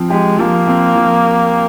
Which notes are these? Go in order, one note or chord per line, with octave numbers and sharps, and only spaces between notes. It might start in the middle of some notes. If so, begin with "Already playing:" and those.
Already playing: F3 C4
G#3 G4
F3 A#3
C4
F3